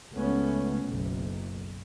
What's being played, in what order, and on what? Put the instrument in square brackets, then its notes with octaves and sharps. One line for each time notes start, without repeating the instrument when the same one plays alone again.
[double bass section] C#2 A3 B3 C#4
F#1 B1